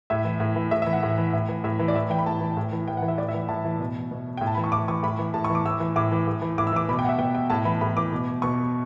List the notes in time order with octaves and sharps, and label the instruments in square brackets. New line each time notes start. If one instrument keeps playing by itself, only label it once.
[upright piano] A2 E5
E3
A2
E3
A2 E5
E5
E3
F#5
A2
E3
A2
E3
A2 E5
E3
D5
A2 E5
E3 G5
B5
A2 A5
E3
A2
E3
A2 G5
F#5
E3
E5
A2 D5
E5
E3
A2 A5
E3
B2
B2
G5
A2
A5
E3 B5
C#6
A2 D6
E3 C#6
A2 B5
E3
A2 A5
C#6
E3
D6
A2 E6
E3
A2 D6
E3
A2
E3
A2 D6
E6
E3 D6
B2 B5
G5
F#5
E5
B2 G5
G5
A2 A5
E3 B5
A2 B5
E3 D6
B2
B2 C#6